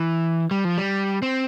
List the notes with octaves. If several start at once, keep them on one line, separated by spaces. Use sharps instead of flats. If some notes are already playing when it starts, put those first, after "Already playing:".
Already playing: E3
G3
F3
G3
C4